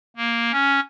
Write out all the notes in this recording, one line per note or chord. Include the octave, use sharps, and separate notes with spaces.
A#3
C#4